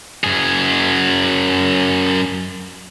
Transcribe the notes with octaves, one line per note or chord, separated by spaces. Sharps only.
F#2 G#4